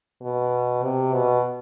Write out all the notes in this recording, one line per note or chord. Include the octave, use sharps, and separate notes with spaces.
B2
C3
B2